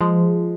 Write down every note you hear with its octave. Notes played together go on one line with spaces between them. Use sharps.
F3 G#3